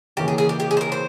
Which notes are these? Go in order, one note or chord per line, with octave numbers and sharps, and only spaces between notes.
C#3 E3 A#3 C#4 G4
G#4
G#4
G4
G4
G#4
C5
A#4
C5